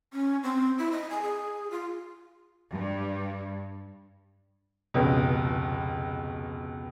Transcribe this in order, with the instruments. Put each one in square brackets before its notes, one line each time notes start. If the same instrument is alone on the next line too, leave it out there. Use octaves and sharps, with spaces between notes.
[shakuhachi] C#4
C4
E4
D#5
G#5
G#4
F4
[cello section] G2
[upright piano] F1 C#2 B2